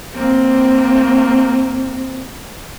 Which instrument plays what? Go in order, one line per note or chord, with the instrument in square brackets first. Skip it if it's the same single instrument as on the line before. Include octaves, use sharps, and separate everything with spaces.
[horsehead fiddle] A#3 C4